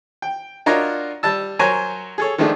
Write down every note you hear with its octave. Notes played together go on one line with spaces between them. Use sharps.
G5
D4 F4 F#4 A#4 C#5 D#5
G3 A5 E6
F#3 A#4 C5 C#5 G#5
G#4 A4 C#5
D#3 F3 G#3 A3 D4